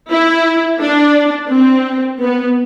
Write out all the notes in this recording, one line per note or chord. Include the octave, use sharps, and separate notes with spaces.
E4
D4
C4
B3